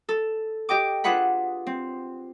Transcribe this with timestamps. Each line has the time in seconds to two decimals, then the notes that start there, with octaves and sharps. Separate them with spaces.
0.09 A4
0.69 G4 D#5 G5 D6
1.04 D4 F4 G#4 B4 F#5 B5
1.67 C4